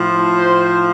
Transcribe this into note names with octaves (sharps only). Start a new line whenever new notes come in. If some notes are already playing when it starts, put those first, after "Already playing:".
Already playing: A2 F3
C5